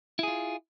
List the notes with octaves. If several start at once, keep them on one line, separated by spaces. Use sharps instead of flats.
E4 F4 G#4